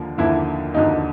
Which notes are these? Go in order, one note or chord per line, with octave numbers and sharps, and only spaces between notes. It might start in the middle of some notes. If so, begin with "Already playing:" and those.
Already playing: D#2 D3 F3 A#3
D#2 D3 F3 A#3 E4
D#2 D3 F3 A#3 D#4